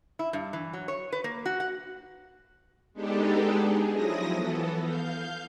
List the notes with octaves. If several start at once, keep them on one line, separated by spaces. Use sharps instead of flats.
E4
G2
E3
F#3
C#5
B4
A#3
F#4
F#5
G#3 B3 D4 D#4 G4 A4
G#4
F3 F#3 E4 D#6 A#6
E3 B3 A4
F5 G6